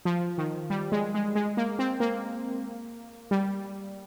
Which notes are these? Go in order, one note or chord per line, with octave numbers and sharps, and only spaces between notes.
F3
D#3
G3
G#3
G#3
G#3
A#3
C4
A#3
G3